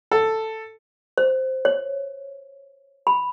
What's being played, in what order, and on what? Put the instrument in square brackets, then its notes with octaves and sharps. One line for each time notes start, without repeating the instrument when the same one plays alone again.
[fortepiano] A4
[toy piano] C5
C#5
B5